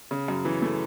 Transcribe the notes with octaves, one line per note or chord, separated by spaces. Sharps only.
C#3
F#2
E3
A3